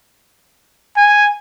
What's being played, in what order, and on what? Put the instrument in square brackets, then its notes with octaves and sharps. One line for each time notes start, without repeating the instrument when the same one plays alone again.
[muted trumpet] G#5